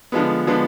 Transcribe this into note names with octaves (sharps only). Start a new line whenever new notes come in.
D3 F3 G#3 B3
D3 F3 G#3 B3